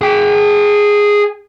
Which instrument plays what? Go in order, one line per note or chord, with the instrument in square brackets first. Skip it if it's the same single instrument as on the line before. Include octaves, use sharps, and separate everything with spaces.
[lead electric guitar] G#4 G5